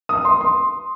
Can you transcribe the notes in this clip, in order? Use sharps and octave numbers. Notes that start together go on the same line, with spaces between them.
D#6
C6
C6